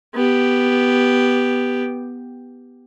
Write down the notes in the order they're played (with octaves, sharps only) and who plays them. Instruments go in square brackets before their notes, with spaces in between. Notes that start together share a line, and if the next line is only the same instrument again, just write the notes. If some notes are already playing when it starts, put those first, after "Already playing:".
[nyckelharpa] B3 G4